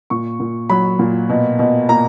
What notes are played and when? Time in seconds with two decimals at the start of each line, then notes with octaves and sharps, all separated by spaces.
0.10 A#2 C#6
0.40 A#2
0.70 F#3 B5
0.99 A#2
1.29 B2
1.59 B2
1.89 A#3 A#5